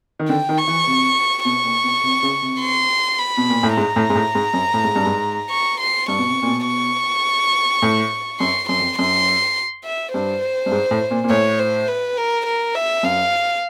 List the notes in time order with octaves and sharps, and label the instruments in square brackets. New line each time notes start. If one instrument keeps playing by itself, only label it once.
[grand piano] D#3
[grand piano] D3 [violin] G5
[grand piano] D#3
[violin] C#6
[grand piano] E3
C3
[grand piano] B2 [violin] C#6
[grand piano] A#2
B2
C3
C#3
C3
[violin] C6
B5
[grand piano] B2
A#2
A2
[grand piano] G#2 [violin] A#5
[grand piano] A2
G#2
A2
G#2
F#2
A2
G#2
G2
G#2
[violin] C#6
C6
[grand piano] G2 [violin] C#6
[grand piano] B2
C3
A#2
B2
[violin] C#6
[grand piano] A2
[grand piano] F#2 [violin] C6
[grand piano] F#2 [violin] C6
[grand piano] F2
[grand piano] F#2 [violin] C6
[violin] E5
[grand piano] G2 [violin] C5
[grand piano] G2
G#2
A2
A#2
A#2
[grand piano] A2 [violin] C#5
[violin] C5
B4
A#4
A#4
E5
[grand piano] F#2 [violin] F5